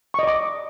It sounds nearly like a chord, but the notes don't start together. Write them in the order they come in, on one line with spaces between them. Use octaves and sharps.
C#6 D#5 D5 D6